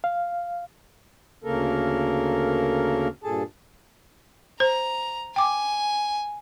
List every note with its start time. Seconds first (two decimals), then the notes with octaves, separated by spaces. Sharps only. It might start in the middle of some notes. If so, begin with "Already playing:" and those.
0.04 F5
1.44 D2 C#3 A#3 A4 A#4
3.24 G2 A#2 G#4 A4 A5
4.60 C5 A#5
5.36 G5 G#5 D6